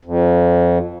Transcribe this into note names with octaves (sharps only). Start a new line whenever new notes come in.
F2